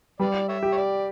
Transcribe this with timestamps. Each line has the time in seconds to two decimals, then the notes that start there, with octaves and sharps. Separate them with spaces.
0.19 G3 B4 D5
0.49 C#5 E5
0.63 G4
0.72 C#5
0.77 D5